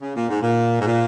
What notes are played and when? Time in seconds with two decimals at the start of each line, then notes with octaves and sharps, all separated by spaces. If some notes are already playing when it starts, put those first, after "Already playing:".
0.02 C#3
0.16 A#2
0.29 G#2
0.41 A#2
0.81 G#2
0.86 A#2